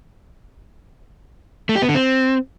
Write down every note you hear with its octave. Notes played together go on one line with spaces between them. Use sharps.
A3
G4
B3
D3
C4